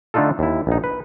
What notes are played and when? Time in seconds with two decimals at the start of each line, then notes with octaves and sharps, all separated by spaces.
0.14 D3 A3 D4 D#4 F4 A4
0.39 D#2 E4
0.67 A#1 D#4
0.84 B4